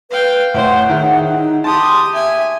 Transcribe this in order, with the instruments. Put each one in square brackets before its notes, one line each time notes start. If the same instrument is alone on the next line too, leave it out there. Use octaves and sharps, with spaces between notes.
[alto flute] B4 [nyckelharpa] F5 G5
[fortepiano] A2 C#5 [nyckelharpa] C5 [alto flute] F#5
[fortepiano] D#3 E4 [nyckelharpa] G#4
[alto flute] D#4
[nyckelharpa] G4 D#6 [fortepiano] A5 [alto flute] C6
[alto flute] E5 [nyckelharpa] G#5